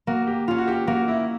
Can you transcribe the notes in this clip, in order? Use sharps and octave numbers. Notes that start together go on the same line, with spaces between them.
A#3 F#4
G4
C#4 F4
F#4
G4
A#3 F#4
E4